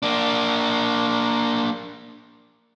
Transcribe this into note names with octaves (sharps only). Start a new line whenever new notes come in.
A#3 D4